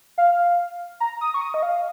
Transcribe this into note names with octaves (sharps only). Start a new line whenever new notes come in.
F5
A#5
D#6
C#6
D#6
D#5
F5